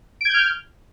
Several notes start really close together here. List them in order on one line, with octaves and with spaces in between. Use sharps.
D7 G#6 G6 F6